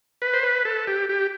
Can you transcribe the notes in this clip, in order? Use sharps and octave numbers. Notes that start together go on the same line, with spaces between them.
B4
C5
B4
A4
G4
G4